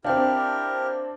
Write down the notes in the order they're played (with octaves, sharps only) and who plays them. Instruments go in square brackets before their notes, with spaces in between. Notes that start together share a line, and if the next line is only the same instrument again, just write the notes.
[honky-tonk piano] C4 D4 [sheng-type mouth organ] E4 G4 A#4 [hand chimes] F5 G5